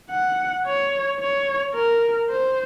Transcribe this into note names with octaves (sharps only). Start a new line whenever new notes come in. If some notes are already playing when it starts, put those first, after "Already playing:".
F#5
C#5
C#5
A#4
C5